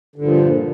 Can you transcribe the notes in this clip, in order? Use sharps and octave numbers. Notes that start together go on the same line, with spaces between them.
G2 A#2 D3 F3